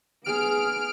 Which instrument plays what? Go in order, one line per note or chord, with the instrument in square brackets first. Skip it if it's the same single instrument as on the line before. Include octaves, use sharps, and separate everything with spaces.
[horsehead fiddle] B3 G#4 [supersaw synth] F6 D7